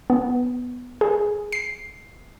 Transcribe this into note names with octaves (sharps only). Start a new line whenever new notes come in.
B3
G#4
C7